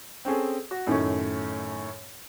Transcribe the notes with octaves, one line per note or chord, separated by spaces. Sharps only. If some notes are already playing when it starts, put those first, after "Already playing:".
C4 C#4 G#4 A4
F#4
F#2 A2 D#3 A3 C#4